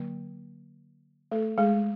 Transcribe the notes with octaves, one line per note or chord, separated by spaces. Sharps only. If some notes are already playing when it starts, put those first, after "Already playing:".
Already playing: D3 F#3 A#3
A3 A4
G#3 G#4